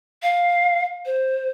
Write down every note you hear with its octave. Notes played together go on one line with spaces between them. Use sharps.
F5
C5